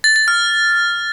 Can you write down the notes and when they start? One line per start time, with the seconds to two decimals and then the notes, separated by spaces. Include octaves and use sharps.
0.04 A6
0.16 A6
0.28 F6